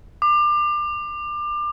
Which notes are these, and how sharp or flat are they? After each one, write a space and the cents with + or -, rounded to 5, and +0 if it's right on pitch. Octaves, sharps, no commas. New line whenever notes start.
D6 +30